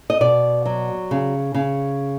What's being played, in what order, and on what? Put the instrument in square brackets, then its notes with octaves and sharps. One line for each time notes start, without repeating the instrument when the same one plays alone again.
[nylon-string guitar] D#5
B2 D5
F#3
C#3
C#3